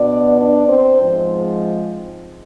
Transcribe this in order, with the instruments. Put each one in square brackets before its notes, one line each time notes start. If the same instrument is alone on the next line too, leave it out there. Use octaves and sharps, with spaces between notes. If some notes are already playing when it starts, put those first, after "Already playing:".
Already playing: [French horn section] B2 B3 D4 D5
D4 D5
C4 C5
G#2 F3 G#3 C4